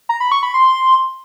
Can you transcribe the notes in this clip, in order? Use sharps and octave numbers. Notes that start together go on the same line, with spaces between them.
A#5
B5
C#6
B5
C6